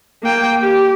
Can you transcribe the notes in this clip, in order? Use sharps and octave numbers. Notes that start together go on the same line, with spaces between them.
A#3 G5
G4